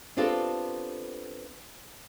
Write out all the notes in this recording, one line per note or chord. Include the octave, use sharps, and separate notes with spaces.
B3 C4 D4 F4 G4 A4